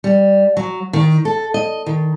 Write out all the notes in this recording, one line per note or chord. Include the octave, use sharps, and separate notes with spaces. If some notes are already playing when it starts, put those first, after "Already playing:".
G3
F#3
D#3
A4
D#5
D#3